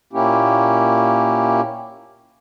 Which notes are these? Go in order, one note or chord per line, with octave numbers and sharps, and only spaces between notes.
A#2 A#3 C#4 E4 G4